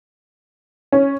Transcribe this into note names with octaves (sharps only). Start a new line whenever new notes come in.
C#4